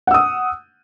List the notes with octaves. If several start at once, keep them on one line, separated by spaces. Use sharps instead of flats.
F#5 D#6 E6